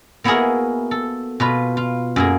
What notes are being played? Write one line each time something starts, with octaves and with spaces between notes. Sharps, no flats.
A#3 B3 E4 F#4 G#4 A#4
A4
B2 F4 B4
F4
F#2 A#3 G#4